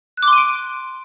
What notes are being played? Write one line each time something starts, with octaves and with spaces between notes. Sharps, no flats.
F#6
D6
C6
D#7
D7